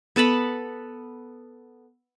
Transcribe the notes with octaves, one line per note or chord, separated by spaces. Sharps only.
B3 A4 A5 B5